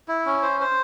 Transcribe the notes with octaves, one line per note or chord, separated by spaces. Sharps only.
E4
C#4
C5
C5